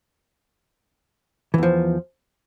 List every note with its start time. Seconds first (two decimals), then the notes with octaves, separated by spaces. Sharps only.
1.54 E3
1.58 E2
1.63 F3